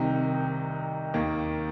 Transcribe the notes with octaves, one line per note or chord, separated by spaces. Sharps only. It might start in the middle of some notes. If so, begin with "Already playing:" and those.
Already playing: C2 C3 D#3 D#4
D#2 D#3 A#3